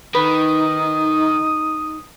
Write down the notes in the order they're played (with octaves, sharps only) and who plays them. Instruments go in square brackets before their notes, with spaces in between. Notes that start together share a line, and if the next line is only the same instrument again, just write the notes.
[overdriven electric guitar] D#3 [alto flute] D#4 [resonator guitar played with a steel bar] B4 [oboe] D#6